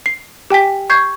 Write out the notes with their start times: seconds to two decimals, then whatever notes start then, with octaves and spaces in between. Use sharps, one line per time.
0.06 C7
0.50 G4 G5 G#5 B6
0.90 C#6 G6 G#6 C7